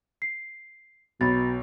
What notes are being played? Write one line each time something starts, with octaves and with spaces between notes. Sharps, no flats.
C7
B1 B2 B5 A6